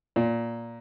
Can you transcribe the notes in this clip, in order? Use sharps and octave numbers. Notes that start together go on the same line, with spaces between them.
A#2